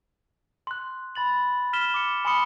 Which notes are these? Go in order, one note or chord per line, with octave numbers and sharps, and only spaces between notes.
C6 F#6
B5 A6 F#7
F6 B6 E7 G7
D6 C#7
G#5 B5 C6 D#6 C#7 G7